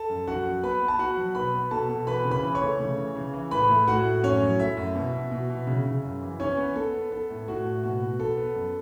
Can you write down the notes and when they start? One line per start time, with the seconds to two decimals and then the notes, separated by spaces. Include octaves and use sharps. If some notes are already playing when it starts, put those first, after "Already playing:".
Already playing: A4 A5
0.10 F#2
0.27 F#2 F#4 F#5
0.45 F#3
0.63 B3 B4 B5
0.81 B3
0.88 A5
0.99 B3 F#4 F#5
1.17 F#3
1.35 B2 B4 B5
1.54 B3
1.71 B2 A4 A5
1.89 B2
2.07 E3 B4 B5
2.25 C#3
2.31 B4 B5
2.43 E3
2.55 C#5 C#6
2.61 A3
2.80 C#3
2.98 E3
3.16 C#3
3.33 E3
3.51 A2 B4 B5
3.69 A3
3.87 A2 F#4 F#5
4.05 A2
4.24 F#2 C#4 C#5
4.42 F#3
4.59 A3 E4 E5
4.77 F#2
4.95 B2
5.13 B2
5.31 B2
5.50 B2
5.67 C#3
5.86 C#3
6.04 F#2
6.21 E3
6.39 B3 C#4 C#5
6.57 B3
6.75 B3 A4
6.93 B3
7.11 B3 A4
7.30 A2
7.48 A2 F#4
7.65 A2
7.83 B2 F#4
8.02 B2
8.19 B3 A4
8.37 B3
8.55 F#2